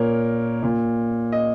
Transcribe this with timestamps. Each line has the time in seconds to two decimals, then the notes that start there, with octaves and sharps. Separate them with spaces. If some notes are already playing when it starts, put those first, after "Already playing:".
Already playing: A#2 A#4 C#5
0.63 A#2
1.32 D#5